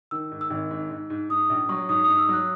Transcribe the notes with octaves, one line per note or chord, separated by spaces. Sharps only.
D#3 E6
G#2
E6
G#1
G#2
G#2
G#2
G#2 D#6
A#1
F#3 C#6
G#2 D#6
G#2 D#6
E6
F#3 F#6